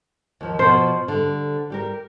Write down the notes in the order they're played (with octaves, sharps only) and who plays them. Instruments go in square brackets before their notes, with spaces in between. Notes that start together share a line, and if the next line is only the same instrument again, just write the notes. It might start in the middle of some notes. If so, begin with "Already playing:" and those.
[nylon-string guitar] D#2 F3
[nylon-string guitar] B2 F3 [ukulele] C5
[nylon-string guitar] D3 G3
G3 G4 A#4